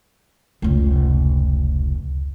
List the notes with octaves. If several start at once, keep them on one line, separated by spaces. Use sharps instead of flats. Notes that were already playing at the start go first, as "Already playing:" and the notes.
F1 C#2